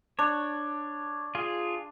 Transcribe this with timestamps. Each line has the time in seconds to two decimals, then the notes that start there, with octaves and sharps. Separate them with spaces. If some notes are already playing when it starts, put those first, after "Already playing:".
0.19 D4 C#5
1.35 F4 G#4